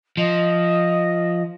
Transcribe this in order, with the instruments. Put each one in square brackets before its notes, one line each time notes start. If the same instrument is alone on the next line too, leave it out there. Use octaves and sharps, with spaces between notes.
[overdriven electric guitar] F3 [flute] D#5